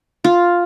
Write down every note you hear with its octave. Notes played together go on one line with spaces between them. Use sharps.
F4